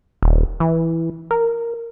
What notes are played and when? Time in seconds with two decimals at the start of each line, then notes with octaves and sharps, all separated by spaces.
0.22 D#1
0.60 E3
1.31 A#4